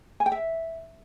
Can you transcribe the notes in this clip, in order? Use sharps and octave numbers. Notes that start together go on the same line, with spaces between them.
G#5
G5
E5